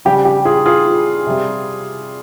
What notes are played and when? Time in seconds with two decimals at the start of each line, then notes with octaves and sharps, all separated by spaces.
0.05 C#3 G3 G4
0.25 G4
0.45 F4 G#4
0.66 F4 G#4
1.26 C3 G3